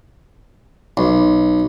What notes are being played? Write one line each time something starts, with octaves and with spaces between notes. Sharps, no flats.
B1